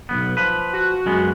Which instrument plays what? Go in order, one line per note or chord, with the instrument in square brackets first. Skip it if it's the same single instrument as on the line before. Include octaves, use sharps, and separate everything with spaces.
[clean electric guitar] B1 F#2 B3
F3 B4
[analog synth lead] F#4
[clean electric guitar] F#2 G#3 B3